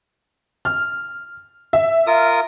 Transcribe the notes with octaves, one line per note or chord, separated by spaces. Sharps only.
F6
E5
F4 A#4 D#6